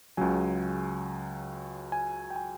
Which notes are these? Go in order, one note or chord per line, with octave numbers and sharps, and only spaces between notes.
C#2 C#3 F#3 G#5
G#5
G5
G#5